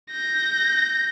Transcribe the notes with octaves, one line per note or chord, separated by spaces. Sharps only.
G6 A#6